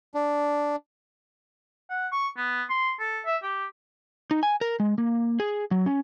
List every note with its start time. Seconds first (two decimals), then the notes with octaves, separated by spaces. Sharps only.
0.14 D4
1.90 F#5
2.12 C#6
2.37 B3
2.70 C6
2.99 A4
3.26 E5
3.43 G4
4.31 D#4
4.43 G#5
4.61 A#4
4.80 G#3
4.98 A#3
5.40 G#4
5.71 F#3
5.86 C#4